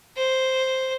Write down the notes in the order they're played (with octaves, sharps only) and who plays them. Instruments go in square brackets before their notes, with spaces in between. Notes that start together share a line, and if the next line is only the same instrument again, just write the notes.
[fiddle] C5